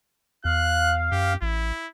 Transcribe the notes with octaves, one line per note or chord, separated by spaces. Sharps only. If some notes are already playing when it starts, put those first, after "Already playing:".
E2 F5 F#6
F#2 G4
A1 E4